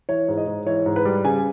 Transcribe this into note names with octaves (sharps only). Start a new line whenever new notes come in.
E3 C#5
G#2
D#5
G#2
E3 C#5
G#2
B4
G3
C#3 G#5